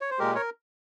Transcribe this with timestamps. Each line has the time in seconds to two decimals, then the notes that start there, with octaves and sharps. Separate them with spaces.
0.01 C#5
0.11 C5
0.19 A#2 G#3 G4 A#4
0.35 A#4 C#5